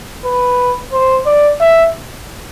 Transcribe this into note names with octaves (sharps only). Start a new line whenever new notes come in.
B4
C5
D5
E5